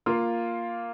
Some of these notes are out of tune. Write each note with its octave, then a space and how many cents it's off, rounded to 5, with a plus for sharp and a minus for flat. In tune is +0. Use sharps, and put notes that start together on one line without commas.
A#3 +0 F4 +0